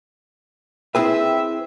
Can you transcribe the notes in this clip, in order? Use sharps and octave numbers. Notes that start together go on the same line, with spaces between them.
C4 E4 G#4 B4 E5 G5